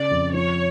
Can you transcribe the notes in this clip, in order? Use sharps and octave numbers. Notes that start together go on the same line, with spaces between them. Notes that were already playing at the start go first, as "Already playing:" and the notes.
Already playing: C#3 D5
F2
F3 C#5